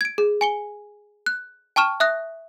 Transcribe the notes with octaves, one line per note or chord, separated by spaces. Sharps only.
G#6 D7
G#4
G#5 C#7 G7
F#6
G5 A5 C#6 F6 E7
E5 D#6 F#6 A#6